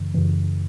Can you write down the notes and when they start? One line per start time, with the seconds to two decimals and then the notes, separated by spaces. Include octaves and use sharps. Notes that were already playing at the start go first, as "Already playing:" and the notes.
Already playing: F#2 C#3 E3
0.14 F#2 C#3 E3